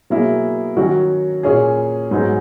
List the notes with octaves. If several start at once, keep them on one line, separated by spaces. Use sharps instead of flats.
B2 F#3 A#3 E4 G#4
D#3 F#3 C#4 F#4
A#2 A#3 C#4 G#4
G#2 F#3 B3 D#4 G#4